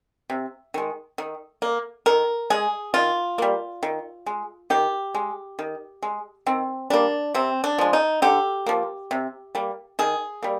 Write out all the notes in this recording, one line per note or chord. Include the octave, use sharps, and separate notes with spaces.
C3
D#3 G#3
D#3
A#3
D#3 A#4
G#3 G#4
D#3 F4
G3 A#3
D#3
G#3
D#3 G4
G#3
D#3
G#3
D#3 C4
G3 A#3 D4
C3 C4
D4
F3 G#3
D#4
D3 G4
F3 A#3
C3
G3 A#3
D#3 G#4
G3 A#3